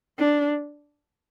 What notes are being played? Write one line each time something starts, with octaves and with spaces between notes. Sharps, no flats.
D4